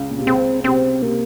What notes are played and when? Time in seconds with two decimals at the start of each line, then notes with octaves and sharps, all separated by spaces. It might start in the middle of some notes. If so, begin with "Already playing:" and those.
Already playing: C#2 C#3
0.10 A#2
0.19 C3
0.27 C#2 C#3 C4
0.64 C3 C4
1.02 C3 A#3